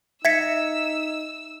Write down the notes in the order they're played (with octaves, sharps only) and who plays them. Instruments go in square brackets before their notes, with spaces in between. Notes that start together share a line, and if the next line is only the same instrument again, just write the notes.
[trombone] D#4 [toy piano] E5 [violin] E6 [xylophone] G#6 B6 C#7